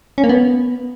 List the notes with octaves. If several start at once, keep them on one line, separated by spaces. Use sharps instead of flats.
C#4
A#3
B3